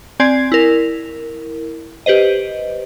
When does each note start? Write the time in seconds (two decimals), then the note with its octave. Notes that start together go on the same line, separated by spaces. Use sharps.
0.20 C4 D5 G#5 G#6 C7
0.52 E4 A#4
2.06 G4 B4 C5 D#5